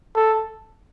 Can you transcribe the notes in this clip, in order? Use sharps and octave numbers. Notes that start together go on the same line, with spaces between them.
A4